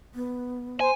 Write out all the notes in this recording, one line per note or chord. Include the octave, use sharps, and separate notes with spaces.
B3
C5 G#5